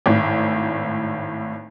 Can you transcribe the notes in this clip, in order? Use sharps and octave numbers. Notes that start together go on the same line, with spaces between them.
G#1 A2